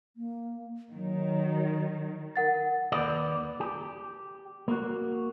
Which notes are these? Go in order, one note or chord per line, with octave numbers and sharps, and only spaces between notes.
A#3
D#3 F#3
A#4 F#5 A6
D#2 B4 D5
G4
A#3 F#4